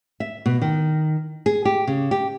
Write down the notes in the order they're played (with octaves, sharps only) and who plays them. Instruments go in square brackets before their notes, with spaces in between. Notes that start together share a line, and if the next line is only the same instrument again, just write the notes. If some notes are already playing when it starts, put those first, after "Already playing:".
[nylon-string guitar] E5
B2
D#3
G#4
G4
C#3
G4